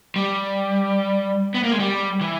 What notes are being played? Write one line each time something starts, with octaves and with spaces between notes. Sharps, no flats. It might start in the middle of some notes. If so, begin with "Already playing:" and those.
G3
B3
A#3
G#3
G3
E3